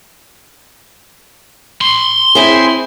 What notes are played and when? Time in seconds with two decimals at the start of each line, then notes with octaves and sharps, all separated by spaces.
1.81 B5 C6
2.35 C4 E4 G#4